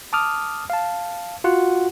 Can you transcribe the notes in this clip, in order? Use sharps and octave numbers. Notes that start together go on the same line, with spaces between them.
A5 D6 D#6 F6
F5 A5
F4 F#4 F#5